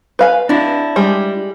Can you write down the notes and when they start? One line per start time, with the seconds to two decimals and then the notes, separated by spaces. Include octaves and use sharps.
0.19 B4 F5 G#5
0.49 D4 E4
0.96 G3 G#3 G#4